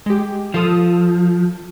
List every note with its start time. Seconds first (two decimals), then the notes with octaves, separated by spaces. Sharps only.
0.06 G#3 G4
0.54 F3 F4 A4 D#6